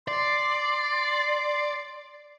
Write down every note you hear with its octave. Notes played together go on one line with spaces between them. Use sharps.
D5 C6